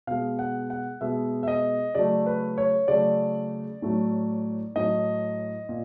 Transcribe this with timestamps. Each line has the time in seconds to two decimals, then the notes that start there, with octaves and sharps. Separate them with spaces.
0.07 B2 G#3 F5
0.39 F#5
0.70 F#5
1.01 B2 G#3 E5
1.43 E5
1.48 D#5
1.95 C#3 F#3 A3 D5
2.26 B4
2.58 C#5
2.88 C#3 F#3 A3 D5
3.82 A2 F#3 A3
4.76 A2 F#3 A3 D#5
5.69 A#2